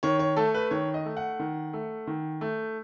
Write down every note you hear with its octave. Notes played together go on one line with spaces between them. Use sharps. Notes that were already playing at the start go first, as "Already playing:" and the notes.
D#3 C#5
C#5
A3 A4
B4
D#3 C#5
D#5
A3
F#5
D#3
A3
D#3
A3